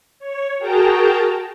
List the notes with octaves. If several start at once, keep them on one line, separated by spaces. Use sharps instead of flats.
C#5
F#4 G#4 A#4 G5 A5 A#5